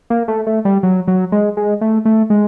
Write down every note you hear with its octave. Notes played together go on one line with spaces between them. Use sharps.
A#3
A3
A3
G3
F#3
F#3
G#3
G#3
A3
A3
G#3